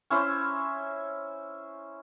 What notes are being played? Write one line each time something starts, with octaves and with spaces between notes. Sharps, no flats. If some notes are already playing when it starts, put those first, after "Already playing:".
C#4 E4 C5